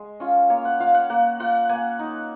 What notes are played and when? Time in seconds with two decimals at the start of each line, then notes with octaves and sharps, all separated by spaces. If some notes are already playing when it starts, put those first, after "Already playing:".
Already playing: G#3
0.20 C#4 F4
0.50 A#3 C#5
0.65 F#5
0.80 F4 F5
0.94 F#5
1.10 A#3 F#5
1.40 F4 F#5
1.69 A#3 G#5
1.99 D#4